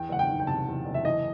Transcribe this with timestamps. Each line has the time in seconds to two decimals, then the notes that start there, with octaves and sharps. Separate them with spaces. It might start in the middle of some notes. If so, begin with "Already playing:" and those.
Already playing: E2 G5
0.09 F#1 F#5
0.19 G5
0.29 D#3
0.40 G5
0.47 C3 A5
0.67 E2
0.86 F#1
0.94 E5
1.05 E3 D#5